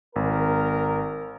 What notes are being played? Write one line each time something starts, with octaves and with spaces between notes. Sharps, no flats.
G#1 A#4